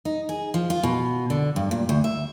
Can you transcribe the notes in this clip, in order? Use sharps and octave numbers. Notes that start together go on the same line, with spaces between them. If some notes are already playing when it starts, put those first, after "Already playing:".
D#4
G#4
F3
F4
B2
D3
G2
A#2
D2
E5